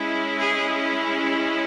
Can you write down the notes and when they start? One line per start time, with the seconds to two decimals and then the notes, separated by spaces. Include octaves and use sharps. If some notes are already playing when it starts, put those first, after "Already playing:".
Already playing: G#3 C#4 E4
0.41 G#4